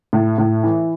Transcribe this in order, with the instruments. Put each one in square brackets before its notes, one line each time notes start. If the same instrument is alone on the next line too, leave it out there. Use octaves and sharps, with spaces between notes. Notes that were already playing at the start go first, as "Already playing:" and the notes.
[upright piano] A2
A2
E3